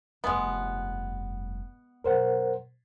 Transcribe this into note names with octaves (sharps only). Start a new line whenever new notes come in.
F1 G2 G#3 B3
F#2 B2 A#4 C5 F#5